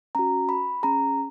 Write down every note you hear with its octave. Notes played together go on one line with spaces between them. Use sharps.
C#4 F#4 A#5
B5
C#4 G#4 A#5